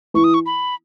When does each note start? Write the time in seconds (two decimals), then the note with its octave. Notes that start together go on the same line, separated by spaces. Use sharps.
0.14 E3 C#6
0.24 D#6
0.34 C#6
0.46 B5